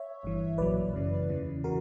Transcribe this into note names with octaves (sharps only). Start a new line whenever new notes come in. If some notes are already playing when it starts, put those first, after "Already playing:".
Already playing: C#5 E5
G1 G2 E3
B1 A#2 F#3 B4 D5
F#2 C#3 E3
E2 C#3 E3
C#3 E3 F#4 A#4